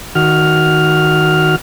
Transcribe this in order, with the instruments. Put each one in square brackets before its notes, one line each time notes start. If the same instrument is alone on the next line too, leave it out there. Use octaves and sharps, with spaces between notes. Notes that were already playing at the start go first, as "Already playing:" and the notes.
[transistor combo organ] D#3 F#4 F6